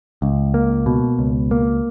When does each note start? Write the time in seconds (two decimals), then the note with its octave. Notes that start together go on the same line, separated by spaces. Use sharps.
0.22 C#2
0.54 A#3
0.86 B2
1.19 C#2
1.51 A#3